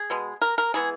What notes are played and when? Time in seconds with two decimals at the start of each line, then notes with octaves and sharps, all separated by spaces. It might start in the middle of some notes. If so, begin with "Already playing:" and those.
Already playing: G#4
0.10 B2 G#3 B3
0.42 A#4
0.58 A#4
0.74 E3 G#3 B3 G#4